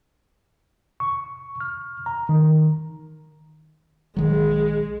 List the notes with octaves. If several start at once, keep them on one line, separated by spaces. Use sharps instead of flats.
C#6
F6
A#5
D#3
A#1 D#3 F#3 G#3